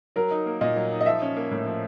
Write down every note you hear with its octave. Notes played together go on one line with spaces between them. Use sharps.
F#3 A#4
D#4
A#3
A#2 D#5
F#3
D#4
D#5
F3 E5
C#4
A#3
A2
F3